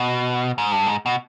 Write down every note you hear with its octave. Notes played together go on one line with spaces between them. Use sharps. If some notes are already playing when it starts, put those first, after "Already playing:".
Already playing: B2
G#2
G2
G#2
B2